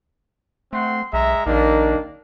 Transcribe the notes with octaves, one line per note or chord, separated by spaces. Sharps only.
A3 C4 F#5 C6
B1 G#3 E5 A#5
A#1 D#3 A#3 D4